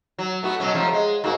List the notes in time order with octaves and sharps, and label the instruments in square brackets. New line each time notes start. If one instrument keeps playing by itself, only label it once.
[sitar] F#3
A3 B3 F#4
B2 F#3 C#4
C3 F3 A3
G#3
G#2 A#3 F#4